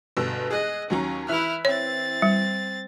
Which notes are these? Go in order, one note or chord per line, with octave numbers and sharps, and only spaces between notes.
G1 B2 E6
G#4 D#5 F#6
D#2 F#3 C#4 A#5
E3 E4 E5 F6 F#6
C4 C#5 A6
G3